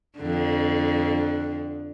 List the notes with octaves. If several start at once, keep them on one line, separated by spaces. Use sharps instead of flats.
F2 D3